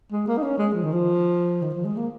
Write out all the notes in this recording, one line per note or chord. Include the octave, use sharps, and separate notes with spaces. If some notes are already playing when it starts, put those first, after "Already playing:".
G#3
A#3
D#4
C#4
G#3
F3
D#3
F3
D#3
F3
G#3
A#3